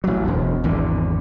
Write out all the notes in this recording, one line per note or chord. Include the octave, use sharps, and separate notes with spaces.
A1 F#3
E1 D2
G#1 E2 D3